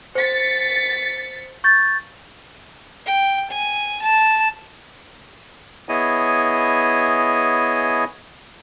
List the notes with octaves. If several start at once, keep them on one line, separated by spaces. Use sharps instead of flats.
C5 A6 B6 C#7
C#6 G6 A6
G5
G#5
A5
B3 E4 G#4 C#5 D#5 G#5